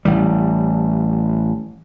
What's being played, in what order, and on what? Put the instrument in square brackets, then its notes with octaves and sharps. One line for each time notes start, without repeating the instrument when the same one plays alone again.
[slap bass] A1 E3 G3